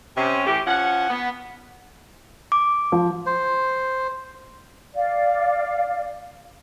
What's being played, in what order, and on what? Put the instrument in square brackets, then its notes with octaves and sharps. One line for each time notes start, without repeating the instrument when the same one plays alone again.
[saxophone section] C3 C#4
A2 E3 G4
F3 C#4 F#5
B3
[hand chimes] D6
[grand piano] F3
[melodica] C5
[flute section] D5 F5